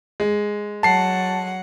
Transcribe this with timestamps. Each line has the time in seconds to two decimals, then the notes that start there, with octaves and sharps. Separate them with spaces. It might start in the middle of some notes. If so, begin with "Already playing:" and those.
0.20 G#3
0.83 F#3 F#5 A5 C7